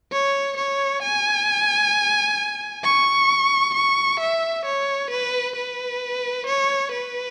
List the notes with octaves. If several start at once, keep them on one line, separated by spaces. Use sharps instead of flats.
C#5
C#5
G#5
C#6
C#6
E5
C#5
B4
B4
C#5
B4